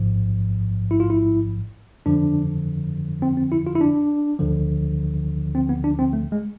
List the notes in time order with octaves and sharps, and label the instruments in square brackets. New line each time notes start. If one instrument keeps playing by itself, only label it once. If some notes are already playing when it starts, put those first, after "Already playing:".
Already playing: [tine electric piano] A1 G#2 F3
E4
F4
E4
F2 D3 F3 D4
C4
C4
E4
F4
E4
D4
D2 D3 F3
C4
B3
D4
C4
A3
G#3